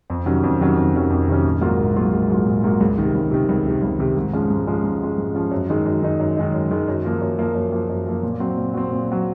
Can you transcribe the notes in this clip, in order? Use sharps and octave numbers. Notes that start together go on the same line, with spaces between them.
F2
C3 D#3 F#3 C#4
F2
C3 D#3 F#3 C#4
F2
C3 D#3 F#3 C#4
F2
C3 D#3 F#3 C#4
A#1
G#2 F#3 A#3 F4
A#1
G#2 F#3 A#3 F4
A#1
G#2 F#3 A#3 F4
A#1
G#2 F#3 A#3 F4
C#2
C3 D#3
C#2
C3 D#3
C#2
C3 D#3
C#2
C3 D#3
G#2
F3 G#3 C#4
G#2
F3 G#3 C#4
G#2
F3 G#3 C#4
G#2
F3 G#3 C#4
F#2
D#3 G#3 D#4
F#2
D#3 G#3 D#4
F#2
D#3 G#3 D#4
F#2
D#3 G#3 D#4
F#2
F3 A#3
F#2
F3 A#3
F#2
F3 A#3
F#2
F3 A#3
A#2
F#3 C4
A#2
F#3 C4
A#2
F#3 C4